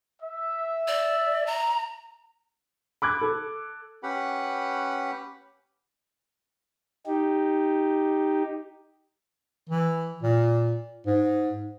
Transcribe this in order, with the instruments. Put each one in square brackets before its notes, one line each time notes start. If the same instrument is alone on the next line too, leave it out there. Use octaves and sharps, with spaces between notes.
[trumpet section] E5
[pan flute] D5
A#5
[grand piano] B5 D6 F#6 G#6
A4
[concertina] C#4 G4 B4 F#5 B5
[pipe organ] D#4 G4
[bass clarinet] E3
A#2
G#2